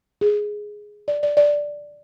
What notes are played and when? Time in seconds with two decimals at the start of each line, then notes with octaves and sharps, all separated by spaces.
0.21 G#4
1.08 D5
1.23 D5
1.37 D5